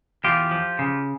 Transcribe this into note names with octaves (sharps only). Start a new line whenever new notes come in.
E2 F4 G4
F3
C#3